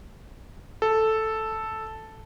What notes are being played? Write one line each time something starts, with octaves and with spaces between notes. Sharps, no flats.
A4